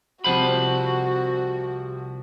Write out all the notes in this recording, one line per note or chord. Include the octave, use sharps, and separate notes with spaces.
C2 C3 F3 F#4 C5 F#5 B5